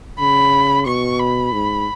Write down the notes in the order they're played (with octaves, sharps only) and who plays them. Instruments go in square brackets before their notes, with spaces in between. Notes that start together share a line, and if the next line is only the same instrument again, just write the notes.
[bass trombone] C#3 [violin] B5
[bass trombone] B2 [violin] C#6
[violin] B5
[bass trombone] G#2